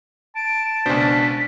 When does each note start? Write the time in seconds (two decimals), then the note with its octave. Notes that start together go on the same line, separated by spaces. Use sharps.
0.36 A5 D7
0.86 C#2 B2 D4 C5 B6